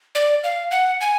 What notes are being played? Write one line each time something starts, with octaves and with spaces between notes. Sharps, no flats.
D5
F5
F#5
G#5